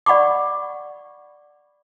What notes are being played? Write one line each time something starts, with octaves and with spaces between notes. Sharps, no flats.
D5 F#5 B5 C#6 D6